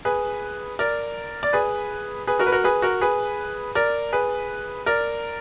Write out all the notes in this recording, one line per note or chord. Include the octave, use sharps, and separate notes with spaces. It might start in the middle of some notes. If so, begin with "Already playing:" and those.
G#4 B4
A#4 D5
D5
G#4 B4
G#4 B4
F#4 A#4
B4
F#4 A#4
G#4 B4
F#4 A#4
G#4 B4
A#4 D5
G#4 B4
A#4 D5